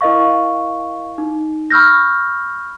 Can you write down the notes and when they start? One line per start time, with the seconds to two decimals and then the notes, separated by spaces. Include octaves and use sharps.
0.01 E4 A#4 D#5 F5 C#6
1.18 D#4
1.70 B5 C#6 E6 F6 G6 A#6